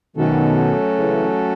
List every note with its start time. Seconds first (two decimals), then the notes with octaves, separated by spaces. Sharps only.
0.16 B2 D#3 F#3 A3 C#4 F#4 A4
0.98 C#3 E3